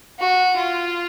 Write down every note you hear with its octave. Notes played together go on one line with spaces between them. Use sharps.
F#4
F4